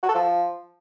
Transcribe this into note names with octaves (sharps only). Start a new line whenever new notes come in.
F#4
A4
F3